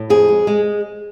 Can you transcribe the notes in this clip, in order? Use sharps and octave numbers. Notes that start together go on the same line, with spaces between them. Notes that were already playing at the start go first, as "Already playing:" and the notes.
Already playing: A2
F2 G#4
G#3
G#3